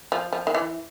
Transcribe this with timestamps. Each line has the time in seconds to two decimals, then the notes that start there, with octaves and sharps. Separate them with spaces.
0.12 F3
0.33 F3
0.47 D#3
0.55 E3